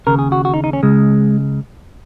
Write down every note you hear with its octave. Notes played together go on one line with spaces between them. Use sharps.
D#2 C#3 A#4
G#4
F#4
F#4
D#4
D#4
C#4
C#2 C#3 G#3